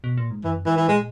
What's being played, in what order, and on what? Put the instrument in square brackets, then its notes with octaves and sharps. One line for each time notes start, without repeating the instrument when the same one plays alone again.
[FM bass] B2
A#2
G#2
[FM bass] F#2 [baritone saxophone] E3
[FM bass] G#2 [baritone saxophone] E3
[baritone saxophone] E3
[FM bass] A#2 [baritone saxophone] G#3